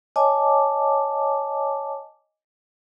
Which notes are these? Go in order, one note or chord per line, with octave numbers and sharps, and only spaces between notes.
C#5 D#5 G#5 A5 D6